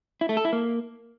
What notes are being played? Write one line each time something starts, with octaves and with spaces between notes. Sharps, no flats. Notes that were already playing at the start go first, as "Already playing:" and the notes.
E4
A3
A4
E4
A#3